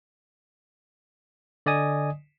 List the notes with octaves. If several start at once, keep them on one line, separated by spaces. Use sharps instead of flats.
D3 D5 D#5 G#5 D#6